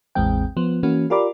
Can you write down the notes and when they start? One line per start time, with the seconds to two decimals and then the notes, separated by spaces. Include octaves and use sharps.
0.15 A1 E2 G#3 C4 G5
0.57 F3 B3
0.83 E3 A#3 C#4 F#4
1.10 F4 G4 A#4 D5 B5 D6